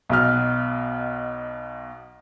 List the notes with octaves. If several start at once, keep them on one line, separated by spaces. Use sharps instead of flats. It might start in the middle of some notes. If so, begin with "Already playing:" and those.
B1 B2 F6